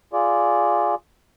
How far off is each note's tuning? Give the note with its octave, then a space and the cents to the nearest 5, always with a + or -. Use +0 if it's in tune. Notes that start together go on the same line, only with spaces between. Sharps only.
F4 +0 G#4 +0 D5 -10